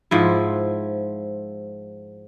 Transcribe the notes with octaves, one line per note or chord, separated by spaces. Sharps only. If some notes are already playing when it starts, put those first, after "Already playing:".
G#2 F3 E4